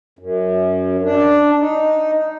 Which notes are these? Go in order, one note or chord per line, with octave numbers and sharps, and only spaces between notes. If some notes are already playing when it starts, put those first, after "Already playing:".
F#2
D4
D#4